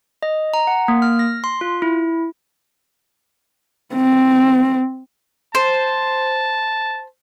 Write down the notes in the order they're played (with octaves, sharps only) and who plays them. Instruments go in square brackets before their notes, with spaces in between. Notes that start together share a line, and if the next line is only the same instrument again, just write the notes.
[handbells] D#5
A#5
F#5
A#3
F6
A#6
C6
F4
E4
[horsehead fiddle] C4
[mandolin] C5 [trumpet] A5